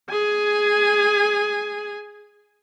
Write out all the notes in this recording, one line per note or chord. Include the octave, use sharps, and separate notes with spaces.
G#4 G#5